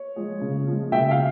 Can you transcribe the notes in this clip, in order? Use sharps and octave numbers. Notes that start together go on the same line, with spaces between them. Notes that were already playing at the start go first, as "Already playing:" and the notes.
Already playing: C#5
F3 G#3
C#3
F3 G#3
C#3 E5 G5
F5